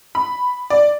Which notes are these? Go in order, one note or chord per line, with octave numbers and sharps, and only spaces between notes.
B5
D5